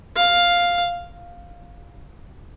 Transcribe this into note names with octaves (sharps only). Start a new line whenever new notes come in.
F5